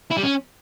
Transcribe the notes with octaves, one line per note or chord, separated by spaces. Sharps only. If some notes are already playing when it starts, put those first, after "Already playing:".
E4
G3
C#4